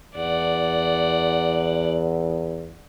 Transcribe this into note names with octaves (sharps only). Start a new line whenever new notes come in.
E2 D5 F#5